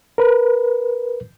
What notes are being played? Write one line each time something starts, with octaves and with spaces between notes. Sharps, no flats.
A#4 B4